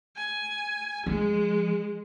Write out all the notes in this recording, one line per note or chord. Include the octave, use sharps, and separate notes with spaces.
G#5
F3 G#3